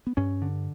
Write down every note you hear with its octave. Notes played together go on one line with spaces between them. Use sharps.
B3
G2 C#4
D3